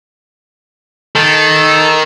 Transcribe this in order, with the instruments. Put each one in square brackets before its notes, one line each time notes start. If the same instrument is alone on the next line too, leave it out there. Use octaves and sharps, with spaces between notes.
[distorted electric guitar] D#3 [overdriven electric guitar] A4